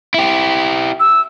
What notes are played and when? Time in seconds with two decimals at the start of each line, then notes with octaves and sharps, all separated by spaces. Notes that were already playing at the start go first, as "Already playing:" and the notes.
0.14 E4 G4
1.00 E6